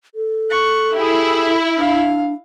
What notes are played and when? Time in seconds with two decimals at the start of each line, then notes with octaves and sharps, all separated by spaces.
0.15 A4
0.50 C#6 F#6
0.95 E4 G4 G#4
1.77 D4 F5